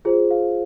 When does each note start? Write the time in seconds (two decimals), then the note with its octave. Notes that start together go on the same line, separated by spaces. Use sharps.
0.05 F4 G#4 C5
0.31 F5